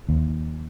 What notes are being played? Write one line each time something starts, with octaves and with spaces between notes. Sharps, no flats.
D#2